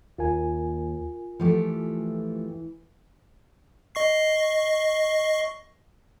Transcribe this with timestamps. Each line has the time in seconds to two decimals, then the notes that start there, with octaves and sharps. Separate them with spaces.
0.18 D#2 F4 A#4 G#5
1.40 E3 F3 A3 G4
3.95 D#5 C#6 C7